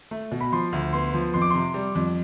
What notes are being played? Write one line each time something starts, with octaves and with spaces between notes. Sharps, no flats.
A3
B2
B5
F3 C6
D2
B3 C6
F3
F2 C6
D6
C3 C6
G3
F2